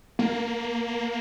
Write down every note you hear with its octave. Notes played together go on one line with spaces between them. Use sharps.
A#3